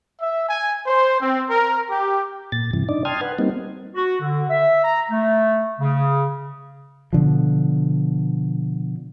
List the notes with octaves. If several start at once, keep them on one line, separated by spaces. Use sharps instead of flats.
E5
G#5
C5
C4
A#4
G4
A#2 A6
G2 C3 E3
D4 D#4 D5
G5 A5 C6 D#6 F6 G#6
B4 F#5
G3 A#3 C4 D#4
F#4
D3
E5
A#5
A3
C#3
B2 D3 F3